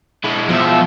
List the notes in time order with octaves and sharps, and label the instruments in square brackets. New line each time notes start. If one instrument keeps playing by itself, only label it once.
[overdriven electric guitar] G#3 E4
[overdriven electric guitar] B2 E5 [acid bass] F3